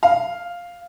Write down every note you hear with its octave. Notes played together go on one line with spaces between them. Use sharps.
F5